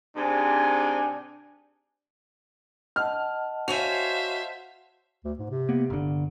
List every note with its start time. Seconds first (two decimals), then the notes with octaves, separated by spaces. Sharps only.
0.17 G#2 C3 D4 G#4 G#5
2.96 D#5 F#5 A5 F6
3.68 F#4 C5 C#5 E5 F5 G#5 F7
5.24 D2
5.39 G#2
5.50 C3
5.69 A#3 B3
5.90 G1 D3